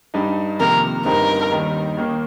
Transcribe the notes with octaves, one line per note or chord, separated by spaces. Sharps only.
G2 G3 D#4
F2 C3 D#3 A#3 A#4
G1 G2 G3 C4 D#4 A#4
D#2 D#3 G3 D#4
D#2 D#3 A#3